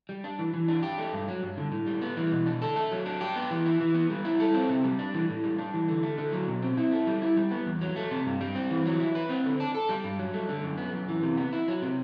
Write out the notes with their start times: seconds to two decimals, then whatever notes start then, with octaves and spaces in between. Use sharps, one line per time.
0.09 G3
0.24 D4
0.39 E3
0.54 E3
0.68 D4
0.83 G4
0.98 A3
1.13 G2
1.28 F#3
1.43 G2
1.57 D3
1.72 A2
1.87 G3
2.01 B3
2.17 E3
2.31 B2
2.46 D4
2.62 A4
2.76 A3
2.91 F#3
3.06 D4
3.21 G4
3.36 B3
3.51 E3
3.66 E4
3.80 E3
3.95 B3
4.10 G3
4.25 E4
4.40 A4
4.54 C4
4.69 C3
4.84 G3
4.99 D4
5.14 E3
5.29 A2
5.44 G3
5.58 D4
5.74 E3
5.88 D3
6.03 A3
6.18 D3
6.33 F#3
6.47 B2
6.62 C4
6.77 E4
6.92 A3
7.07 G3
7.22 E4
7.37 G3
7.51 B3
7.66 E2
7.81 F#3
7.96 A3
8.11 C3
8.26 G2
8.41 G3
8.55 C4
8.70 E3
8.85 F#3
9.00 E4
9.15 B4
9.29 C4
9.44 D3
9.60 D4
9.74 A4
9.89 G3
10.04 G2
10.19 F#3
10.33 A3
10.49 D3
10.63 F#2
10.78 B3
10.93 F#2
11.08 E3
11.23 C3
11.37 B3
11.53 E4
11.68 F#3
11.82 C3